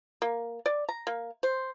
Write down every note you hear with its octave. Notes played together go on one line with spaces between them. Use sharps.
A#3
D5
A#5
A#3
C5